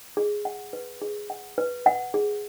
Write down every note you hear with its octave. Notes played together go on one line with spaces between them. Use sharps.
G#4
F#5
B4
G#4
F#5
B4
F#5
G#4